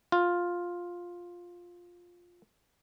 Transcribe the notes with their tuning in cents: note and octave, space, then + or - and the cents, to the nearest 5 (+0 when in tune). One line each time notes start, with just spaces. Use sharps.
F4 +10